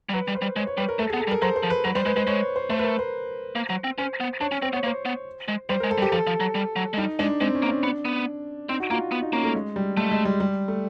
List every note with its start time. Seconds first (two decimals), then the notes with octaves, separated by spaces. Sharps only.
0.09 G3
0.13 F#3 B4
0.28 G3
0.35 C5
0.42 G3
0.56 G#3 C#5
0.67 C#5
0.78 G3 B4
0.89 A#4
0.99 A3 A4
1.10 B3 G#4
1.20 A4
1.27 G3
1.31 A#4
1.42 F#3 C5
1.56 C5
1.63 F3
1.70 B4
1.85 F#3 B4
1.95 G3 C5
2.06 G#3 B4
2.17 G#3 C5
2.27 G#3 C#5
2.56 C5
2.70 A3 C5
2.79 B4
2.84 A#4
2.99 C5
3.56 A#3
3.70 F#3
3.84 C4
3.98 C#4 C5
4.20 B3
4.41 D4 C#5
4.52 C#4
4.62 C4 C5
4.73 B3 C#5
4.83 A#3
4.87 C5
5.05 B3
5.48 G#3
5.69 G3 C5
5.80 G#3 A#4
5.91 A4
5.98 G3
6.02 G4
6.12 F3 A4
6.27 F3
6.40 F#3
6.55 G3
6.76 F#3
6.93 G#3
6.98 G3 D#4
7.19 G#3 D4
7.41 G#3 C4
7.55 C#4
7.63 A#3
7.69 D4
7.83 B3
8.05 B3
8.69 C4 D#4
8.80 F#4
8.90 A#3 F4
9.12 B3
9.22 D#4
9.33 A#3 C#4
9.44 A3
9.55 G#3
9.76 G3
9.97 G#3 A3
10.12 G#3
10.25 G3
10.40 G3
10.68 A3